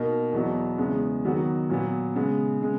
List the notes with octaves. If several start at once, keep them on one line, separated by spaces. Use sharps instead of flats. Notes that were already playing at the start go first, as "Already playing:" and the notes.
Already playing: B2 A#3 D#4 A#4
E2 B2 F#3 B3
E2 C#3 G#3 B3
D#3 F#3 B3 F#4
A#2 F#3 B3
C#3 G#3 B3
C#3 G#3